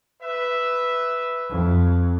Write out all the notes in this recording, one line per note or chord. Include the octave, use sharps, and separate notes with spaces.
B4 E5
F2